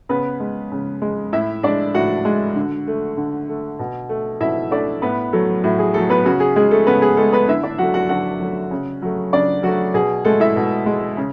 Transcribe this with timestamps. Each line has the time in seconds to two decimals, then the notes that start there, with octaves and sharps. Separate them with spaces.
0.09 C#3 B3 B4
0.40 G#3
0.72 C#3
1.02 G#3
1.33 A2 E4 E5
1.63 G#3 D4 D5
1.95 A2 F#4 F#5
2.25 G#3
2.55 D3
2.87 A3
3.17 D3
3.49 A3
3.79 B2
4.09 A3
4.41 B2 E4 E5
4.71 A3 D4 D5
5.02 A2 B3 B4
5.33 F#3 A3 A4
5.63 A2 F#4
5.79 G#4
5.94 F#3 A3 A4
6.09 B3 B4
6.25 C#3 F#4
6.40 G#4
6.56 G#3 G#4
6.71 A3 A4
6.86 C#3 B3 B4
7.02 G#4
7.17 G#3 A3 A4
7.32 B3 B4
7.48 D3 E4 E5
7.63 D4 D5
7.78 F#3 A3 F#4 F#5
7.94 F#4 F#5
8.09 D3 F#4 F#5
8.40 F#3 A3
8.71 C#3
9.02 F#3 A3
9.33 C#3 D4 D5
9.63 F#3 A3 F#4
9.94 B2 G#4
10.25 G#3 A3 A4
10.40 E4 E5
10.56 B2
10.86 G#3
11.17 C#3